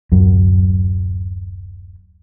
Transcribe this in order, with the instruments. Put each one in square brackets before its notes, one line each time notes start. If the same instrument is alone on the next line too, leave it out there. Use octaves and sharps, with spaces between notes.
[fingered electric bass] D1 F#2 F#3